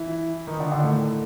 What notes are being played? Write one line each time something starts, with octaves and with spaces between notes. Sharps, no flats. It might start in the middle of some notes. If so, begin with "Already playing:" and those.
Already playing: E3 E4
D#3 D#4
D3 D4
D3 D4
A2 A3